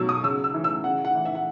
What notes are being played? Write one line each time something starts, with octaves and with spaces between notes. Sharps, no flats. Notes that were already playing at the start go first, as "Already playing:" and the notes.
Already playing: B2 F#3 E6
D#6
C#3 E6
E6
E3
E6
C#3 F#5
F#5
E3
E5
F#5